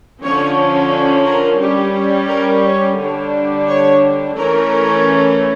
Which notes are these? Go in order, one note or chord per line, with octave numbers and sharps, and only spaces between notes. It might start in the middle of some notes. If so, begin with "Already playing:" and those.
D3 F3 C#4 C#5
A#4
G3 C#4 G4
A#4
C#5
D3 G3 D4 C#5
C#5
E3 A3 C#4 A#4